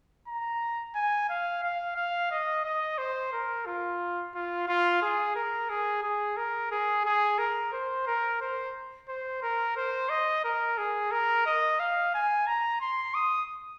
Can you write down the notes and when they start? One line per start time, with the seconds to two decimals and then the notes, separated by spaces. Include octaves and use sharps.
0.28 A#5
0.95 G#5
1.29 F5
1.63 F5
1.96 F5
2.31 D#5
2.65 D#5
2.98 C5
3.33 A#4
3.66 F4
4.35 F4
4.68 F4
5.02 G#4
5.36 A#4
5.70 G#4
6.03 G#4
6.37 A#4
6.72 G#4
7.06 G#4
7.38 A#4
7.73 C5
8.07 A#4
8.41 C5
9.09 C5
9.43 A#4
9.77 C5
10.10 D#5
10.44 A#4
10.78 G#4
11.12 A#4
11.46 D#5
11.80 F5
12.14 G#5
12.47 A#5
12.81 C6
13.15 D#6